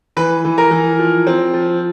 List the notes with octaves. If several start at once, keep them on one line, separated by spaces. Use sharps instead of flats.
E3 B4 B5
E3
A#4 A#5
E3
F3
C4
F3